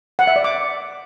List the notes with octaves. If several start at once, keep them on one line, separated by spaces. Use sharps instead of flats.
F#5
E5
D5
D6